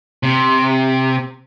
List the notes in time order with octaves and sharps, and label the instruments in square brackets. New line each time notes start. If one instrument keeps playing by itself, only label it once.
[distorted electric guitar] C3